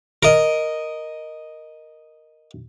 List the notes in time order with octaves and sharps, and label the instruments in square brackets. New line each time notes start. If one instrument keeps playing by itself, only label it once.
[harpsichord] A#4 D#5